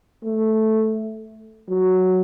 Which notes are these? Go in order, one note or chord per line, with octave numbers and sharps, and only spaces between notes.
A3
F#3